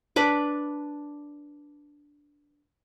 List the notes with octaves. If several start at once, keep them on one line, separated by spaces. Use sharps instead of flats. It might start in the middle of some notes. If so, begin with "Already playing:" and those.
D4 B4 D6